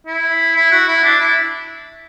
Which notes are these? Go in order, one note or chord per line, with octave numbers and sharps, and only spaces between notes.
E4
E4
F#4
E4
D4
E4